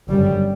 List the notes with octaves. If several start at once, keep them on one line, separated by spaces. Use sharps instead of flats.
G1 F#2 C#3 G3